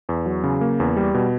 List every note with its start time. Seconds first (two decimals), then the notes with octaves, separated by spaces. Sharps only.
0.09 E2
0.26 F#3
0.44 C#3
0.61 A#3
0.80 E2
0.96 G3
1.14 B2